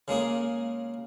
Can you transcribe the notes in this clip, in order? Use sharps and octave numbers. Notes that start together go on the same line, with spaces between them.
C#3 G#3 A#3 G#4